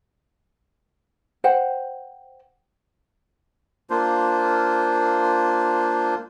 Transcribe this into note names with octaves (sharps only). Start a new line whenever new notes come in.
C5 F#5 G5
A#3 D4 F4 C5